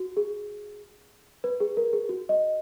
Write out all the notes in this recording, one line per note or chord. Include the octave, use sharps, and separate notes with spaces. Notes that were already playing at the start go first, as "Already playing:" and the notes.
Already playing: F#4
G#4
B4
G#4
A#4
G#4
F#4
D#5